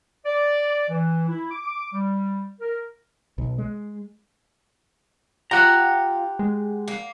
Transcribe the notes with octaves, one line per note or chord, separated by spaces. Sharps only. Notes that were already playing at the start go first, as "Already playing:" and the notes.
D5
E3
E4
D6
D6
G3
A#4
B1
G#3
F4 G4 F#5 A#5
G#3
A#3